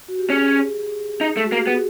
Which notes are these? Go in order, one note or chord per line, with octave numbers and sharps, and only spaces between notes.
F#4
G4
C#4 G#4
D#4
A3
F#4
A#3
G4
B3 G#4